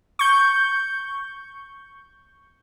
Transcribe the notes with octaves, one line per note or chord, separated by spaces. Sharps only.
C#6 G6